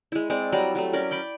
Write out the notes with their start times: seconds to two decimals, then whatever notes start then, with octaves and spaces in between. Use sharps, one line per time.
0.12 G#3 E4
0.30 G#3 C4 D5
0.52 F#3 G3 D5 A#5
0.75 F#3 G3 A3
0.93 C#4 A#4 D5
1.11 G5 B5 D6